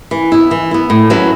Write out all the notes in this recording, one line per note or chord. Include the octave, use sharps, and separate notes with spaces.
E3
B3 E4
E3
B3 E4
A2
F#3 C#4 E4 B4